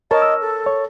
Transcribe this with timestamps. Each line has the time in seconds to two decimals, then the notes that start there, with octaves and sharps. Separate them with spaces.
0.11 A#4 C#5 D#5 A5
0.22 E6
0.41 A4
0.66 C#5